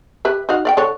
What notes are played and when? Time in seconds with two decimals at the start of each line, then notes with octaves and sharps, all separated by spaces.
0.25 G4 B4 E5
0.49 D#4 F#4 F5
0.65 D5 F5 G5
0.77 D3 A4 C#5